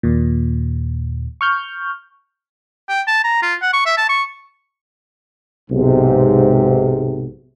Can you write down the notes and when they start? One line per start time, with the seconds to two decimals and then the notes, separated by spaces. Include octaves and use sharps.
0.03 D#2 A#2
1.41 C#6 F6 G6
2.89 G5
3.07 A5
3.24 A#5
3.42 F4
3.62 F#5
3.73 C#6
3.86 E5
3.97 A5
4.09 C#6
5.71 B1 G#2 C3